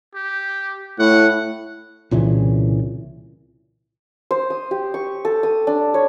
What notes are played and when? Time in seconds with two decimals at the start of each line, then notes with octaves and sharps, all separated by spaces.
0.15 G4
0.99 A2 F#5
2.11 C2 A#2 C#3 E3
4.31 C5
4.50 D#6
4.71 G4
4.94 C#6
5.25 A4
5.43 D#6
5.67 D4
5.94 C#5